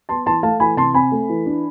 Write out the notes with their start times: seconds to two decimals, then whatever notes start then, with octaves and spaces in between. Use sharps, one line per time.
0.09 B3 A5 C6
0.26 E3 A5 C6
0.43 A3 F5 A5
0.60 E3 G#5 B5
0.77 C3 A5 C6
0.94 C4 G#5 B5
1.12 A3
1.29 E3
1.46 D4